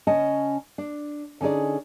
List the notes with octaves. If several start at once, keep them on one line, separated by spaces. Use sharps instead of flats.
C#3 C#4 D#5 A5
D4
D3 C#4 D#4 G#4 D5